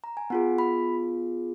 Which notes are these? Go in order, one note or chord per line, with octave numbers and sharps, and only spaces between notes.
A#5
G#5
B3 F4 G#4 F#5
B5